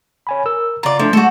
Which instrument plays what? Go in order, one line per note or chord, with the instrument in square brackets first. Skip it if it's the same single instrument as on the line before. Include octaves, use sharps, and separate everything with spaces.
[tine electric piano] C#5 G#5 B5
A#4 E6
[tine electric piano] C#3 A#5 [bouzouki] F4 D5
[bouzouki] F3 [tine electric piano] A3 D4
[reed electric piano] G#3 A3 [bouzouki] F#4 A4 [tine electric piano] G6 C#7